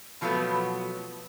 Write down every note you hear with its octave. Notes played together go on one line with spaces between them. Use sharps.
B2 F3 F#3 A3 B3